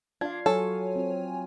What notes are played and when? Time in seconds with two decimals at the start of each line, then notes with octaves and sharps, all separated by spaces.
0.21 D4 F4 F5 G#6
0.46 F#3 A4 C#5 G#5
0.96 C4 F4